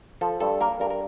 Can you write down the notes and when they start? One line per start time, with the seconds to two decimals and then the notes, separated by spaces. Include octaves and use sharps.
0.21 F3 A4
0.40 G2 A4
0.61 A#3 A#4
0.80 G2 A#4
0.90 A#4